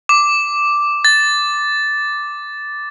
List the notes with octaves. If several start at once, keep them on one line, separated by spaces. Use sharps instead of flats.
D6
A6